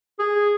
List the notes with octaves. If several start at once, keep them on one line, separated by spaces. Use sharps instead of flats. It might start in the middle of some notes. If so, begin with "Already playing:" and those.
G#4